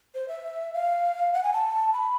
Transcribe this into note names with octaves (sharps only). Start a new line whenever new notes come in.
C5
E5
F5
F#5
G#5
A5
B5